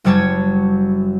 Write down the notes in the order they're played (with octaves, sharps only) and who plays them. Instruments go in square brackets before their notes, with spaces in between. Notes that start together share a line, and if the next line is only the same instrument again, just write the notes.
[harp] F#1 F#2 G3 C#5 A5 G#6